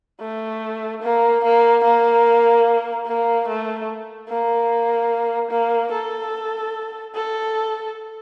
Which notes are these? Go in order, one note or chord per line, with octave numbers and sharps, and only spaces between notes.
A3
A#3
A#3
A#3
A#3
A3
A#3
A#3
A4
A4